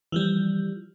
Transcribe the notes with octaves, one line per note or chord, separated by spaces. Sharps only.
E3 F3 G3